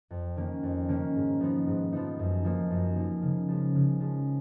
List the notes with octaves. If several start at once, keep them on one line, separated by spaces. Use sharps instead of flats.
F2
D#3 A#3 C#4
F2
D#3 A#3 C#4
G#2
F3 B3 D#4
G#2
F3 B3 D#4
F#2
F3 A#3 D#4
F#2
F3 A#3 D#4
C#3
F3 G#3 C#4
C#3
F3 G#3 C#4